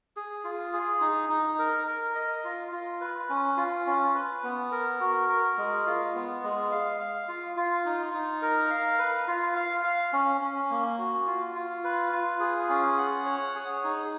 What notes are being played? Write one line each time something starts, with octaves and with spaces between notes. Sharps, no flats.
G#4
F4
G#4
D#4
D#4
A#4
A#4
D#5
F4
F4
B4
C#4
F4
C#4
B4
B3
A#4
F#4
A#4
G#3
F4
B3
G#3
F5
F5
F4
F4
D#4
D#4
A#4
F5
B4
F4
F5
F5
C#4
C#4
A#3
F#4
F4
F4
B4
F4
G#4
C#4
F#5
C#5
G#4
D#4